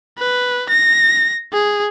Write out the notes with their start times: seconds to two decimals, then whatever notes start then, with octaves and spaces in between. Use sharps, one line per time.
0.19 B4
0.69 A#6
1.53 G#4